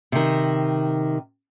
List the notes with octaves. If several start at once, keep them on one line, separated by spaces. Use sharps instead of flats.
C3 D#3